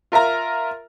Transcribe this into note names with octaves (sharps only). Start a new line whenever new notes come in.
F4 A#4 E5 A#5